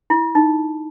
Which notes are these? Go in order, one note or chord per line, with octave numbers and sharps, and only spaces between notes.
E4
D#4